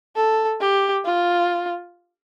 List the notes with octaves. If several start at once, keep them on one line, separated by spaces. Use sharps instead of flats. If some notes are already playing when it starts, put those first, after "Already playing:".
A4
G4
F4